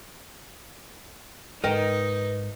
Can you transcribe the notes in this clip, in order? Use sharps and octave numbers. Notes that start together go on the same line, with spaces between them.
G#2 G#3 D#4 A#4 B4 D#5 G5